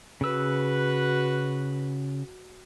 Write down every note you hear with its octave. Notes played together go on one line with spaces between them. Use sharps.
C#3 F#4 B4 E6